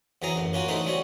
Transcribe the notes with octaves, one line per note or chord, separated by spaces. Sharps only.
E2 E3 F#3 G#4 A#5
A1 F#2
A#3 C#4 F4 F#4
E3 F#3 A3 D#4 C5
F#3 G3 C4 C#4 C#5